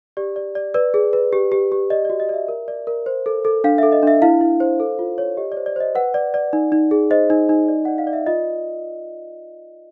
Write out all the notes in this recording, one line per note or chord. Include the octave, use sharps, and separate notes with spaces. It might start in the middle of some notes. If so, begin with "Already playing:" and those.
G4 D5
D5
D5
B4 D5
G#4
B4
G4
G4
G4
D5 D#5
F#4 D5
D#5
D5 E5
A#4
D5
A#4
C5
A4
A4
D4 F5
A4 E5
D#5
D4 E5
E4 F5
E4
C5
A4
F4
C#5
G4 D#5
D5
C5
D5
C5 D#5
B4 F#5
D5
D5
D#4
D#4
G#4
C5 D#5
D#4
D#4
D5
D5 F#5
F5
D5
E5
F4 D#5